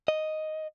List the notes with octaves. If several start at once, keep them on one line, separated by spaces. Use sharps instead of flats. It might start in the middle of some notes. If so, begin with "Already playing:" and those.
D#5